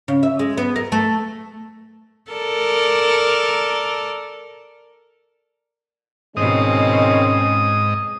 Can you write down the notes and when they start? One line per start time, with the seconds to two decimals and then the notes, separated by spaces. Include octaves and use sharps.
0.08 C#3
0.23 E5
0.39 G#3
0.57 B3
0.76 A#4
0.92 A3
2.31 A4 A#4 D5
6.37 G#2 B2 D#3 G#3 C4 C#4 D#5 D#6